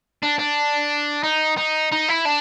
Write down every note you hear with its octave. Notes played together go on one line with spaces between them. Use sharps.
D4
D4
D#4
D#4
D#4
E4
D4